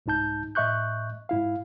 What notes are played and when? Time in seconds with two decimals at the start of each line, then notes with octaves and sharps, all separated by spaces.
0.06 C2 G#2 D#4 A5 G6
0.55 A2 D#5 E5 C#6 F#6 G6
1.29 G#2 E4 F5